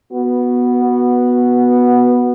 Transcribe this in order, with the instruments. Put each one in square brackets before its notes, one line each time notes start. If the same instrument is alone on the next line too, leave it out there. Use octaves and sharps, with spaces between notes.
[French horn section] B3 F#4